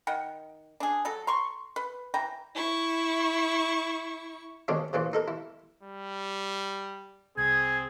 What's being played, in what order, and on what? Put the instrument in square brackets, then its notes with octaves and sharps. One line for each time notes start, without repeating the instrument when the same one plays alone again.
[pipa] D#3 F#5 G5
D4 G#4
F#3 A4
A#5 C6 C#6
B4
E3 G5 A#5
[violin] E4 C#6
[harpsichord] B2 D#3 G#3 C#4 D4
A#2 C#3 E3 F3
D#4 A4 A#4
E4
[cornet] G3
[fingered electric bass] C2 [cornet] C4 [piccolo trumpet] G#4 [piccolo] G#6